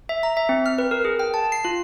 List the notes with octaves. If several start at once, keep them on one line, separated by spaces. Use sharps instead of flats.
E5
A#5
E5
C4
F6
B4
A#4
G#4
G5
A5
C7
F4